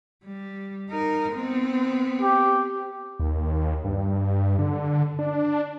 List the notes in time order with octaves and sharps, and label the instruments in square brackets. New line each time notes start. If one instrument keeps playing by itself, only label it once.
[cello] G3
D#4 A#4
B3 C4
[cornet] G4
[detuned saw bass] D#2
G2
D3
D4